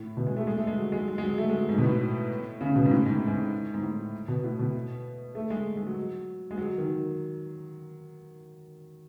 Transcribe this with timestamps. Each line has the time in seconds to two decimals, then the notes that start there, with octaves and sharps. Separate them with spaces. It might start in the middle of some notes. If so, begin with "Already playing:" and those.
Already playing: A2
0.17 B2
0.26 G#3
0.36 A3
0.47 G#3
0.57 A3
0.67 G#3
0.78 F#3
0.92 G#3
1.08 G#3
1.18 G#3
1.23 F#3
1.38 A3
1.49 G#3
1.59 F#3
1.69 G#2
1.78 B2
1.84 A2
2.61 C#3
2.76 B2
2.86 G#2
2.91 A2
3.06 G#2
3.28 G#2
3.74 G#2
3.82 A2
4.28 B2
4.44 A2
4.59 B2
5.35 A3
5.50 G#3
5.77 G#3
5.87 F#3
6.51 G#3
6.58 F#3
6.78 D#3